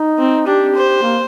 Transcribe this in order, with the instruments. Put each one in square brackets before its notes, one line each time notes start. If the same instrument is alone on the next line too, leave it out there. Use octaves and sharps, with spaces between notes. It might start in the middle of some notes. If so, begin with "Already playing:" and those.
Already playing: [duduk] D#4
[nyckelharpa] C4
[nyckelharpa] D4 [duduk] G4
[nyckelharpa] C5
[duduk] A#3